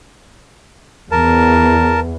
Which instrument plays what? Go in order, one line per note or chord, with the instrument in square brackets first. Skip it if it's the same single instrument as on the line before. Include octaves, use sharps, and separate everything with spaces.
[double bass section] E2 [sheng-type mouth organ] A#4 A5